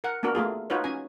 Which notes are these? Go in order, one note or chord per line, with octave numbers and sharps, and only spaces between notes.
A#4 F#5
A#3 B3 D4 F#4 A#4
A3 A#3 F4 G#4
D#4 F4 F#4 B4 C#5
C#4 G#5